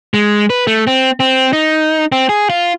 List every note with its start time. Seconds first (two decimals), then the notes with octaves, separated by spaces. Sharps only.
0.14 G#3
0.50 B4
0.67 A3
0.87 C4
1.20 C4
1.53 D#4
2.12 C4
2.29 G#4
2.50 F4